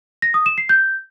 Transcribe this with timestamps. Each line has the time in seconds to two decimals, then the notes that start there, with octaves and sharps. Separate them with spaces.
0.22 A#6
0.34 D#6
0.46 E7
0.58 C7
0.69 G6